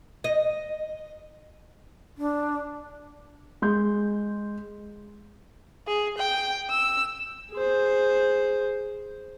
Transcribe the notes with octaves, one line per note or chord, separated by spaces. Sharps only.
D#5
D4
G#3 C6 G6
G#4
G5
E6
G#4 C5